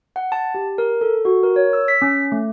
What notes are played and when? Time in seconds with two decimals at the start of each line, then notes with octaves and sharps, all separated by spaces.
0.16 F#5
0.32 A5
0.55 G4
0.78 A#4
1.01 A4
1.25 F#4
1.43 A#4
1.56 C#5
1.73 E6
1.88 B6
2.02 C#4
2.32 A3